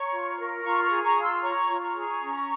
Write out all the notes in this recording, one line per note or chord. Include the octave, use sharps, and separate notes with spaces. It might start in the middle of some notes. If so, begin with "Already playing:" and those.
Already playing: C#5 A#5 C#6
F4
A#4
F4 A#5 C#6
A#5 C#6
G#4
A#5 C#6
F4
C6 E6
C#5 A#5 C#6
F4
A#5 C#6
G#4
C#4